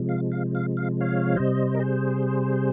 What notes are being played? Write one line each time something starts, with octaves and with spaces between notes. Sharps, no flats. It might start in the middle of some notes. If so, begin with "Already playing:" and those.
Already playing: C3 F3 G#3
F5
F5
F5
F5
C#5 F5
C3 G3 C5 D#5
A#4
G#4 C5